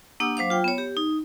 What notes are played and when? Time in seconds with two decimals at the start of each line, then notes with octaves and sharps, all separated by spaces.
0.20 A#3 D4 G4 F#5 D#6 E6
0.37 F#3 C5 F5 D6
0.50 F4 G5
0.64 B3 C#5
0.78 G4
0.97 D#4